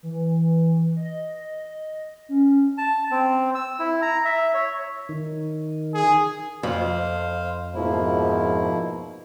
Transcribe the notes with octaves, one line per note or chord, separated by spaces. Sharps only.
E3
D#5
C#4
A5
C4
E6
E4
A#5
E5
C#5
D#3
G#4
F2 C5 F5
G#2 B2 F3 A#3 E4